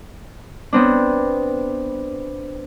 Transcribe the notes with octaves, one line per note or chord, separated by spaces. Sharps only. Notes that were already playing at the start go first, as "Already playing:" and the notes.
B3 C4 D4